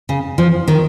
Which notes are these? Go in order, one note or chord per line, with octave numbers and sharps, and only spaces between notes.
C#3
F3
D#3